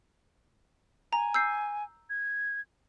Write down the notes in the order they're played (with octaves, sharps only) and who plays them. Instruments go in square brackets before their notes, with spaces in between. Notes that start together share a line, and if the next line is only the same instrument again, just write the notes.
[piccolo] G#5 [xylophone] A#5
[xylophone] E6 G6 C7
[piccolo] G#6